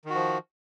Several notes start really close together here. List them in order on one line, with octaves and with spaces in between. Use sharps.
D#3 F#4 F3